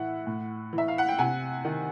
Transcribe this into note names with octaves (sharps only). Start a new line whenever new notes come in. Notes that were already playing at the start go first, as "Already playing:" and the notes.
Already playing: A2 E3 E5 F#5
A2
E3
E5
F5
F#5
G5
C3 F#5 G#5
D#3